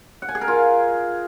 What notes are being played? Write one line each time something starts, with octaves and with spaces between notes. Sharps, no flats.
F#5
G#5
G#4
A#4
F4